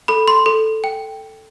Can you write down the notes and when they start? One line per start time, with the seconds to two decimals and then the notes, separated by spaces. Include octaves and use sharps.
0.08 A4 B5
0.28 C6
0.46 A4
0.84 G5